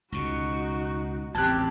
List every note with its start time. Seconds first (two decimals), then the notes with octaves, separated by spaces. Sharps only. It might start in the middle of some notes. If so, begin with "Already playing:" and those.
0.12 C#2 B2 D#4 F#4 C#6
1.35 A1 D#2 C4 G4 A5 F#6 G#6